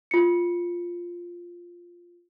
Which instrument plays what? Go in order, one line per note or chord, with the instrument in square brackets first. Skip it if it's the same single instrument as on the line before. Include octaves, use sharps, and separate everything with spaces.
[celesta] F4 C#7